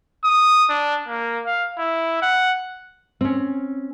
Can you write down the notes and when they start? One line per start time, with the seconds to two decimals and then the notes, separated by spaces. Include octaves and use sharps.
0.24 D#6
0.69 D4
1.08 A#3
1.45 F5
1.78 E4
2.22 F#5
3.21 C4 C#4